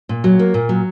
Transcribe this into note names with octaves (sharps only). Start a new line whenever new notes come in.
A#2
F#3
A#3
A#2
F#3